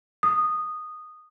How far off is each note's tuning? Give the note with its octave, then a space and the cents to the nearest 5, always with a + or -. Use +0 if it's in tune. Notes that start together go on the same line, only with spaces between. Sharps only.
D#6 -10